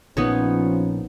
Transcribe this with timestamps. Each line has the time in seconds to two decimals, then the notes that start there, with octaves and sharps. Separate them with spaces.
0.17 A#1 F3 B3 C#4 D#4 C#5